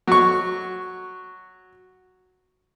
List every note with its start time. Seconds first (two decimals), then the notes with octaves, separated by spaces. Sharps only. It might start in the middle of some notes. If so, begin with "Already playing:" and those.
0.07 F#3 C#6